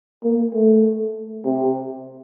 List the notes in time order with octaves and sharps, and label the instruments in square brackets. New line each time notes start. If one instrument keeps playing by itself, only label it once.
[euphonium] A#3
A3
C3